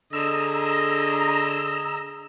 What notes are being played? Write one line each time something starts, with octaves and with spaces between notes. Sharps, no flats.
D3 G#4 D#5 A#5 E6